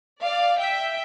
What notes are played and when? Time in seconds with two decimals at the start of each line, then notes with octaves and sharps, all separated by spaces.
0.21 D5 F5
0.59 E5 G5